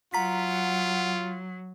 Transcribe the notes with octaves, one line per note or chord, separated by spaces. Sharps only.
F#3 F4 F#5 A#5 B6